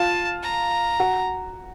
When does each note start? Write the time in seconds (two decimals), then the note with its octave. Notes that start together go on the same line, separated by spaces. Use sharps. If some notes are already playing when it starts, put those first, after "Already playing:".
Already playing: F4 A5
0.43 A#5
1.00 F#4